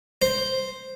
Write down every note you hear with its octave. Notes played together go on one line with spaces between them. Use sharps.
C5